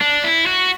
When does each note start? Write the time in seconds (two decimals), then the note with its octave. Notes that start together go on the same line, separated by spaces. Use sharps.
0.01 D4
0.24 E4
0.47 F#4